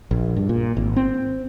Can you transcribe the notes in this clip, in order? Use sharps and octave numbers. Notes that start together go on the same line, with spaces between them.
A#1
G2
A#2
G#1
C4